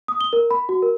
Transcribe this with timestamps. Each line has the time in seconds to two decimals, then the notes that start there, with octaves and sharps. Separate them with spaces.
0.08 D#6
0.21 G7
0.33 A#4
0.51 B5
0.69 F#4
0.82 A#4